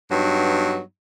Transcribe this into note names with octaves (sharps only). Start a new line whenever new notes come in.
G2 F#3 B3 D#4